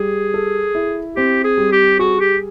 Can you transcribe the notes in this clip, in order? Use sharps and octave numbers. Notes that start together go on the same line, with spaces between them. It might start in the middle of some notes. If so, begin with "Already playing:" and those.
Already playing: G3 G#4
A4
E4
C4 G4
G#4
G3
G4
F#4 G#4
G4